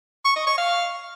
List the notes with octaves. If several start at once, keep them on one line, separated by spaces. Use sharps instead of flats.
C#6
D#5
C#6
F5